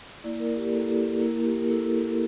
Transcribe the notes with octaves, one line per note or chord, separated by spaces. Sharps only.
A#3 E4 D5
A#4
G4
A#3 E4 A4
G4
A#3 E4 A#4
G4
A#4
A#3 E4 A4